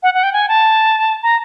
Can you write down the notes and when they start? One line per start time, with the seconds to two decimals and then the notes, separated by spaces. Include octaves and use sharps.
0.03 F#5
0.14 F#5
0.23 G5
0.33 G#5
0.48 A5
1.23 A#5